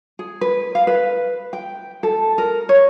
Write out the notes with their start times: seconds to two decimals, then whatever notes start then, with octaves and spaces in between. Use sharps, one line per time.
0.19 G#4
0.41 B4
0.75 F5
0.87 B4
1.53 G5
2.03 A4
2.38 A#4
2.69 C#5